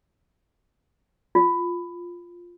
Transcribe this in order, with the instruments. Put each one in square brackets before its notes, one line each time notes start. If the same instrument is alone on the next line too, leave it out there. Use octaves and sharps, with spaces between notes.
[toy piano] F4